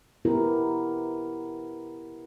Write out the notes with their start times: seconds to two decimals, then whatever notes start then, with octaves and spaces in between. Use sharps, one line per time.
0.25 B3 E4 G4 A#4